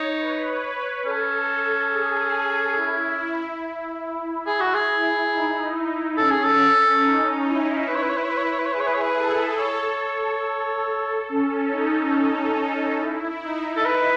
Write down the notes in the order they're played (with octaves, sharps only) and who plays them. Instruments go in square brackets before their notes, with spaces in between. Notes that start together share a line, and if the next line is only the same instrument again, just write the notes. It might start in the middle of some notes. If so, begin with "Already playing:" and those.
Already playing: [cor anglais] D#4 [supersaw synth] C#5
[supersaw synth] B4
[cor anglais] C#4 [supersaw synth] A4
[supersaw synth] G#4
E4
[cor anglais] G#4
F#4
G#4
[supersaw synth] D#4
[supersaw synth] C#4 [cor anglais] A4
[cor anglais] G#4
A4
[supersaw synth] D#4
E4
[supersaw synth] E4 [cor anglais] B4
[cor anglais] C#5
B4
C#5
B4
C#5
B4
C#5
B4
C#5
B4
C#5
[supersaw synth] G#4 [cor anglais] B4
[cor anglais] C#5
B4
C#5
B4
[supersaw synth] A4
[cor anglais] C#5
[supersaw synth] C#4
D#4
D#4
E4
D#4
[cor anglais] A4
[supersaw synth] E4 [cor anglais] B4